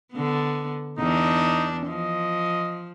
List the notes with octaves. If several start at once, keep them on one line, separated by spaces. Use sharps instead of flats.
D3 B3
E2 D4 D#4
F3 D#5